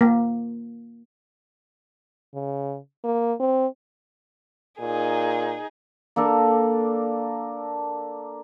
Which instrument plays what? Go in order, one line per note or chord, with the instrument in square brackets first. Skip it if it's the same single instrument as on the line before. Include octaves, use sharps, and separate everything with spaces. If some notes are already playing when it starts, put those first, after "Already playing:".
[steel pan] A#3
[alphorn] C#3
A#3
C4
[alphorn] A#2 [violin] D#4 G#4
[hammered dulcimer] A#3 D4 A4 A#4